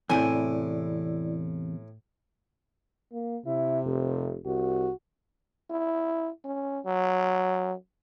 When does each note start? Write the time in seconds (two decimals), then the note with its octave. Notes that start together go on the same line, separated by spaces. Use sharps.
0.10 E2 A2 C3 E3 E4 D5 G#5
3.13 A#3
3.46 C3 E4
3.85 F1
4.46 C2 F#4
5.70 E4
6.45 C#4
6.85 F#3